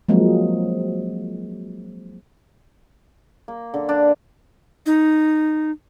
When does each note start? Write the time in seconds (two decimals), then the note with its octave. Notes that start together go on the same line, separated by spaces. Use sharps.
0.09 F3 F#3 G#3 A#3 C4
3.48 A#3
3.74 D3
3.89 D4
4.86 D#4